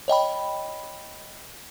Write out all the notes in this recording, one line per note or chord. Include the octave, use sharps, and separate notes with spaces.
C#5 D#5 G5 B5